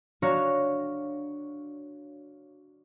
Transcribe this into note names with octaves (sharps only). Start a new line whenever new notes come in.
D4 F#4 C#5 F5 A#5